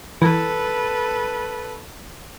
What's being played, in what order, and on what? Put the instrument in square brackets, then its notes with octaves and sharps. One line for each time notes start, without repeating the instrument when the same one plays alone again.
[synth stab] E3 [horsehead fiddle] A4 B4